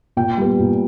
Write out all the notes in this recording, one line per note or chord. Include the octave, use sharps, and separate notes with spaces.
A#2 G5
G3 B3
A#2